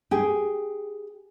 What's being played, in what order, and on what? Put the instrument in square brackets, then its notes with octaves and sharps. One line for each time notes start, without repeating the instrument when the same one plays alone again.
[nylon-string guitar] G4 G#4